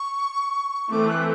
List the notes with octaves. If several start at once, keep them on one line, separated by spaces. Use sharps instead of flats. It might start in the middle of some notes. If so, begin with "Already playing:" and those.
Already playing: C#6
E3 A3 C4 D6
F#6